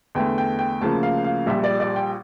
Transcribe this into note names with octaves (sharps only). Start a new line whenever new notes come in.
E2 D3 A3 G5
G5
G5
D2 C#3 F3 A#3 A5
F5
F5
A#1 A#2 G3 E5
D5
D5
G5